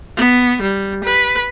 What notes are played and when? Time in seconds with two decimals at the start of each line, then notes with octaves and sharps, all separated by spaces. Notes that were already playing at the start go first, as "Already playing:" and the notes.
0.17 B3
0.62 G3
1.04 B4